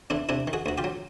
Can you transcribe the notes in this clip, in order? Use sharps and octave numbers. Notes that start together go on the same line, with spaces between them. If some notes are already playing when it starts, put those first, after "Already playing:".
E2 D4 E4
C3 D4 E4
D#3
F#4 G#4
D2 F#4
F4 G4
F#3